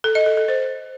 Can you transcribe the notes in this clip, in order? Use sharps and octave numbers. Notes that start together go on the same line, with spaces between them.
A4
D#5
A4
A4
C5